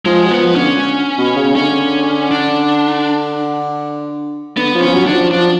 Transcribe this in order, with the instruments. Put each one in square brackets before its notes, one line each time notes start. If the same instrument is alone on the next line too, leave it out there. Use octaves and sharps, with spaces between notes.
[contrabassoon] F3 [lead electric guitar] G#3
[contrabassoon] F#3
[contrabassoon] F3 [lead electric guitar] B3
[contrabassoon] D3 [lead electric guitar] C#4
[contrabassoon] B2
C#3
[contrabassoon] D3 [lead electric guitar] C#4
[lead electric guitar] D4
[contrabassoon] D3 [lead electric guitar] B3
[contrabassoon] F3
[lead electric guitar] C#4
[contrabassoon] F3
F#3
[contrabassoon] D3 [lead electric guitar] D4
[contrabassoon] F3
[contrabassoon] F3 [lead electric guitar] D4